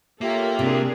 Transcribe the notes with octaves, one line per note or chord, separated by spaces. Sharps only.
A#3 F4 G4 A4 A#4 C#5 E5
C3 D4 G#4 A#4